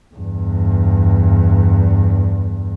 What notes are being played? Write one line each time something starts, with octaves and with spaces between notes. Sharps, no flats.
E2 G2